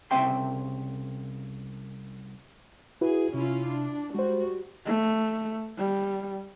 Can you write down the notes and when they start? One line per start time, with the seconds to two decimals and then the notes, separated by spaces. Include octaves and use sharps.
0.11 C2 C#3 C4 E5 G5 C6
3.01 E4 F#4 G#4 B4
3.34 C3 C#4 E4 F4
3.67 D4
4.15 G3 G#3 F#4 C5
4.86 A3
5.78 G3